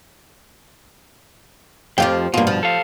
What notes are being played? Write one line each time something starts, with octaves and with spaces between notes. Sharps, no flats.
F2 F3 F4 G4
G2 B2 A#3 F4
F3
A4 F5